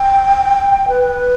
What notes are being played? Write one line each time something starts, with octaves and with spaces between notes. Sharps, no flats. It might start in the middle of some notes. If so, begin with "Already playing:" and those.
Already playing: G5
B4